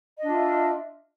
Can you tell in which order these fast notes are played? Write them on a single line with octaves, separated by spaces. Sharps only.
D#5 D4 F4 E5